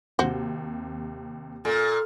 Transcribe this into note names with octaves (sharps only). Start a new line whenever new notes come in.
D#2 C3 F#4 C5
A#2 A4 G#5 F6